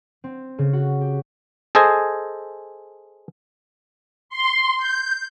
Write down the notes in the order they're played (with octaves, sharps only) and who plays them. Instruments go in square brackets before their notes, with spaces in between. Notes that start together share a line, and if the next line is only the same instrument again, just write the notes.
[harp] C4
C#3
F#4
G4
[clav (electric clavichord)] G#4 A4 C5 D#5 G#5
[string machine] C6
G6